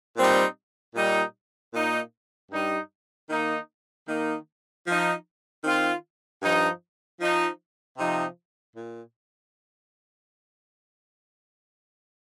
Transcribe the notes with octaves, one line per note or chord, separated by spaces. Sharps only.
A#2 G3 C4 D#4
A#2 G3 D#4
A#2 A#3 D#4
G2 G3 D#4
D#3 A#3 D#4
D#3 A#3 D#4
F3 D#4
D#3 C4 F4
G2 F3 D#4
F3 D#4
C3 F3 D#4
A#2